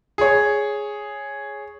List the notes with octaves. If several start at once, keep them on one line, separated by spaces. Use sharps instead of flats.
G#4 C#5